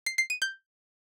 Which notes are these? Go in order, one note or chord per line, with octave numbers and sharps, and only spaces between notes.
C7
C7
D#7
G6